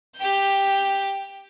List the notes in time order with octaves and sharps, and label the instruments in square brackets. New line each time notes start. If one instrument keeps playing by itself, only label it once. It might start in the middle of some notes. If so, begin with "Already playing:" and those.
[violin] G4 G6